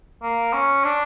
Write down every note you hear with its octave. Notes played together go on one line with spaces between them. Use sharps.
A#3
C#4
D4